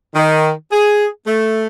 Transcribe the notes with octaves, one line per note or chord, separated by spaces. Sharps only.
D#3
G#4
A3